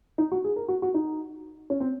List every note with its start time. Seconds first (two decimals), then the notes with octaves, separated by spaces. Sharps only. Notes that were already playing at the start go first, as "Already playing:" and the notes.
0.18 D#4
0.32 F#4
0.44 G#4
0.56 A#4
0.68 F#4
0.82 F#4
0.94 D#4
1.70 C#4
1.80 C4